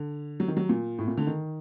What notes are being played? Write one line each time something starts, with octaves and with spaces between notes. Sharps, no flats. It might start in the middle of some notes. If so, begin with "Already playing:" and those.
Already playing: D3
F#3
D#3
F#3
A#2
A2
A#2
D3
D#3